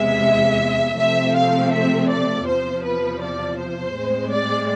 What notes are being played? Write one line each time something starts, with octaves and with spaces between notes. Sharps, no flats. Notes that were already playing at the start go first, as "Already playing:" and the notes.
Already playing: E2 C3 G#3 E5
C3 F3 A3 C4 E5
F5
E5
D5
E2 C3 F3 C5
B4
D5
C5
A2 G#3 C4
D5